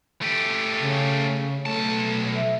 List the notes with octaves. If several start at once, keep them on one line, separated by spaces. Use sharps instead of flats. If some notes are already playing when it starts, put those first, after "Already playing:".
A3 G4
C#3
B1 A3 A5
E5